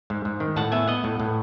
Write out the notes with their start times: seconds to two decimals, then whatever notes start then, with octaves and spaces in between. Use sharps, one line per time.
0.10 G#2
0.25 G#2
0.40 D#3
0.56 A2 F#5 A5
0.72 B3 E5 G#5
0.88 B3 D#5 F#5
1.04 A2
1.20 A2